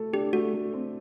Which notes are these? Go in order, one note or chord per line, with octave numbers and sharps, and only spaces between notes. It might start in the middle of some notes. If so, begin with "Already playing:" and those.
Already playing: A3 A4
D4 G4
A3 F#4
A3
C4